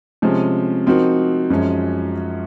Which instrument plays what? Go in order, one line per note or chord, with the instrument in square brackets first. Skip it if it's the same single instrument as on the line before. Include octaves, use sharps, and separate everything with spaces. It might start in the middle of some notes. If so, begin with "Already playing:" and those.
[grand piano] C3 F3 G#3 C#4
F3 C4 D#4 F#4 A#4
F#2 F3 G#3 C#4